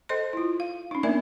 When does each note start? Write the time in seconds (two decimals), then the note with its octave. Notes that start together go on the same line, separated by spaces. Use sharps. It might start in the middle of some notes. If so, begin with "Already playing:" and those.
0.09 A4 C5 D#5 C6
0.33 E4 F4
0.60 F5
0.91 C#4 D#4
1.03 A#3 B3 D4 A#4 D5 E5